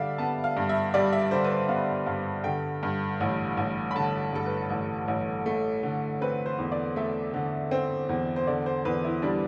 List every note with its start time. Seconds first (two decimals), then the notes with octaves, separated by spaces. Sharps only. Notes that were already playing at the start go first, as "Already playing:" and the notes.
Already playing: D3 G3 D5 E5 F5
0.18 B3 A5
0.44 F5
0.57 G2
0.69 E5
0.94 G3 D5
1.13 E5
1.31 D3 C5
1.44 B4
1.51 C5
1.69 B3 F5
2.06 G2 F5
2.44 D3 G5
2.83 G2
3.20 A1
3.57 A1
3.91 B5
3.95 D3 A5
4.33 G2 A4
4.46 B4
4.70 A1
5.08 A1
5.46 A3
5.83 D3
6.21 C4 B4
6.46 C5
6.59 E2
6.72 D5
6.96 A3 E5
7.34 D3
7.71 C4
8.09 E2
8.36 C5
8.47 D3 D5
8.66 C5
8.85 E2 B4
9.04 E4
9.22 G3 D4